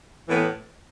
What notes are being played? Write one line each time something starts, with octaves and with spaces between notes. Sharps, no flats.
A2 E3 B3